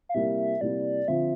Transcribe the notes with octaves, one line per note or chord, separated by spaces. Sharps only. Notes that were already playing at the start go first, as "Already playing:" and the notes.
F5
C3 G3 A#3 E4 E5
C3 G3 A#3 E4 D5
D3 F3 C4 F4 E5